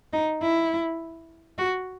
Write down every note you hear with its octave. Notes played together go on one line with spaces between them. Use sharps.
D#4
E4
F#4